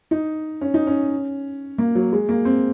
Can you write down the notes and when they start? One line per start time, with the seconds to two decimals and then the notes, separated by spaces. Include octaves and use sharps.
0.11 D#4
0.61 C#4
0.74 D#4
0.87 C#4
1.78 A#3
1.95 F#3
2.12 G#3
2.29 A#3
2.45 C4